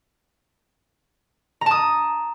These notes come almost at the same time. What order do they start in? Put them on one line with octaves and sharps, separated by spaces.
A#5 A5 D#6